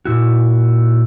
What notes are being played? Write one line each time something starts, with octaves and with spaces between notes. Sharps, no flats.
A#2 E4 F#4